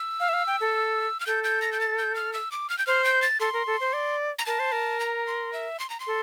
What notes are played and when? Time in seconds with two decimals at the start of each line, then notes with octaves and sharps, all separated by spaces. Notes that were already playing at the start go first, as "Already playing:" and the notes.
Already playing: E6
0.20 F5
0.29 E5
0.33 F5
0.47 G5
0.60 A4
1.20 F6
1.27 A4 G6
1.44 G6
1.62 A#6
1.72 G6
1.81 A6
1.98 G6
2.15 F6
2.33 E6
2.52 D6
2.70 F6
2.78 G6
2.87 C5 F6
3.04 G6
3.22 A6
3.40 A4 C6
3.53 A#4
3.67 A4
3.80 C5
3.93 D5
4.39 A#5
4.46 A#4 A5
4.59 C5
4.72 A#4
5.00 A#5
5.27 C6
5.53 E5
5.80 C6
5.90 A#5
6.00 C6
6.07 A4